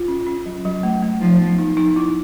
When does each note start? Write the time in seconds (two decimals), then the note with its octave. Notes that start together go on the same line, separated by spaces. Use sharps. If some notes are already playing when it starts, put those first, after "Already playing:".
Already playing: F4
0.08 C#4
0.27 C#4
0.46 F#3
0.65 F#3
0.83 A3
1.02 A3
1.20 F3 D#4
1.39 B3
1.58 D#4
1.77 D#4
1.96 E4